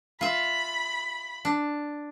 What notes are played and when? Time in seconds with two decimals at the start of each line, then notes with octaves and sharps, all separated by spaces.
0.21 F4 E5 B5
1.45 D4